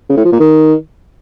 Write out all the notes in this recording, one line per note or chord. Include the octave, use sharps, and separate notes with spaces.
C#3
A2
F3
A#2
D#3